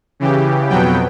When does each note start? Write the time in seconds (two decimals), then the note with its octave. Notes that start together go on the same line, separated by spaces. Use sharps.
0.20 C#3 E3 G4
0.69 F2 B2 F#3 B3 G5